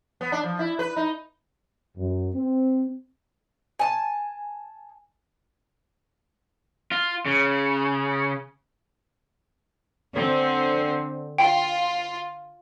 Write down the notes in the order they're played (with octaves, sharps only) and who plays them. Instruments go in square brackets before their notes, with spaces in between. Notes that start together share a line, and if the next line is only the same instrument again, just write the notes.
[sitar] B3
D4
F3
E4
B4
D#4
[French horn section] F#2
C4
[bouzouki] G#5 A5
[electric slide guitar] F4
C#3
[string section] D3 C4
[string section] F4 [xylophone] G5